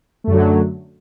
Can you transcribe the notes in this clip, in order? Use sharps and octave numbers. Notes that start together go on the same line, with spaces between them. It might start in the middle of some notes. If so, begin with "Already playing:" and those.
F#2 D3 F#3 A3